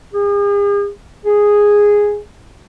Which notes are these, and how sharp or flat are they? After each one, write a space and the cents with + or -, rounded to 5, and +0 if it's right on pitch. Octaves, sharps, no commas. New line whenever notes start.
G#4 -45
G#4 -5